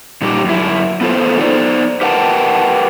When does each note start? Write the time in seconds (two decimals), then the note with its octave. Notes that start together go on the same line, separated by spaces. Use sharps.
0.22 A#2 G3 D#4 G4
0.45 F#2 E4
1.01 B3 F4 A4 C5
1.39 B3 D#4 C5 D5
2.01 G4 A#4 B4 F#5 G5 A5